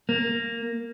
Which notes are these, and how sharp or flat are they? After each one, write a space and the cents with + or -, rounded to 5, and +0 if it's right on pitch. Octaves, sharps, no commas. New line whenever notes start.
A#3 -10